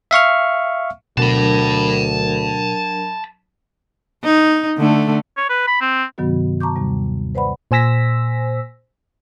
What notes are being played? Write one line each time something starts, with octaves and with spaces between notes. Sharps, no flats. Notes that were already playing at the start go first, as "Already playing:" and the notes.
E5 F5 C#6 F6
D2 B2 F#3 D4 A#4 A5 B5
D#4
D3 A3
C#5
B4
B5
C4
G2 C3 D#3 F#3 B3 F#4
A5 A#5 C#6 D6 G6
D#2 C3 G3
B4 C5 D5 F#5 B5
A#2 C5 G#5 E6 A#6 B6